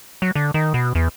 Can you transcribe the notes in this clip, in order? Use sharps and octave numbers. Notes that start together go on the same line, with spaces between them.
F#3
D3
D#3
B2
E2